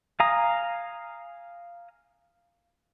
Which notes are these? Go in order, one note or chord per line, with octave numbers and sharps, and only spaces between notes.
F5 G#5 A#5 D#6